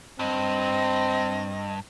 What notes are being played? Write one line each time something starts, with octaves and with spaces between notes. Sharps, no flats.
G2 C4 D#5